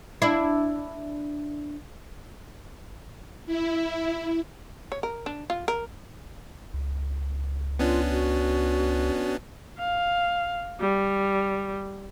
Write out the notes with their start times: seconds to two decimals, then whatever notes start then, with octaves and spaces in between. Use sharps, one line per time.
0.22 D4 E4
3.46 E4
4.92 C#5
5.03 A#4
5.26 D4
5.50 F4
5.68 A#4
6.74 C#2
7.79 B3 C#4 D4 F4
8.11 F#4
9.79 F5
10.80 G3